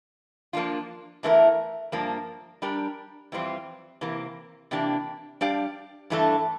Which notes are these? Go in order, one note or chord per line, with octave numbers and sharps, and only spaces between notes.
F3 A#3 D4 F4
E2 E3 A3 E4 A#4
G2 F3 A#3 D4
G3 D4 G4 A#4
F2 E3 G3 C4 F4
C3 E3 A#3
C3 E3 A#3 D4 G4
G3 D4 G4 D5 F5
G2 E3 A3 D4 A4